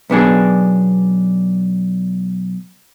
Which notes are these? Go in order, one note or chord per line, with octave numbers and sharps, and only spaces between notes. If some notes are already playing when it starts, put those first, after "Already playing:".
B1 B3 D4 G#4